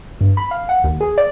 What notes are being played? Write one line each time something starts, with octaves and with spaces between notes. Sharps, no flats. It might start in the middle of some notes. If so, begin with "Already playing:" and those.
G2
B5
F5
F#5
D#2
G#4
D5